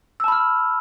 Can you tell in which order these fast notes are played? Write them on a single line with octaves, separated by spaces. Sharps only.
E6 A5 B5 F6